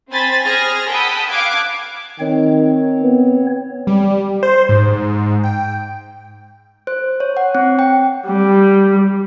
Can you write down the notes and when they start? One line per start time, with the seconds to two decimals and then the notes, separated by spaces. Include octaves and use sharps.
0.10 C4 C5 G#5 B5 A6
0.44 G#4 C5 F6 G#6 A#6
0.88 F#5 G5 A5 B5 D#6 E6
1.29 F5 A5 D6 F#6 G#6
2.20 D#3 C4 C#5
3.03 B3
3.87 G3
4.43 C5
4.69 G#2
5.44 G5
6.87 C5
7.20 C#5
7.37 F#5
7.55 C4
7.79 G5
8.27 G3